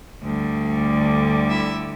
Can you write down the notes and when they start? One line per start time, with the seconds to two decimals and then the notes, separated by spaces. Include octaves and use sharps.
0.22 D2 D3 G3
1.50 E4 E5